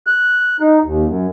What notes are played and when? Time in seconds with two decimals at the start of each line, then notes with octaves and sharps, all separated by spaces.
0.07 F#6
0.60 D#4
0.84 D#2
1.06 F#2